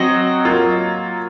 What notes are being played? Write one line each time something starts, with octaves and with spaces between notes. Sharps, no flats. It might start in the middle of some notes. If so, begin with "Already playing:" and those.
Already playing: F#3 C4 F#4 D#5
F#3 A#3 F4